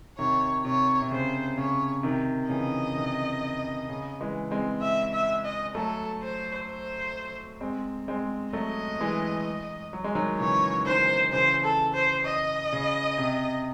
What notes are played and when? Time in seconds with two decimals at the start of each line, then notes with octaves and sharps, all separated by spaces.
0.18 C3 D#3 C#5
0.65 C3 C#5
1.02 C3
1.11 C#3 C5
1.58 C#3 C#5
2.03 C3 D#3
2.50 C#3 E3 D#5
2.97 C3 D#3
3.89 C#3
4.21 E3 G#3
4.51 G#3 C4
4.82 E5
5.14 E5
5.44 D#5
5.75 F#3 A3 A4
6.22 C5
6.68 C5
7.61 G#3 C4
8.08 G#3 C4
8.53 F#3 A3 D#5
9.00 E3 G#3
9.93 F#3
10.04 G#3
10.15 D#3 F#3
10.39 C#3 E3 C#5
10.86 D#3 F#3 C5
11.32 C#3 E3 C5
11.64 A4
11.94 C5
12.25 D#5
12.72 C#3
13.18 C3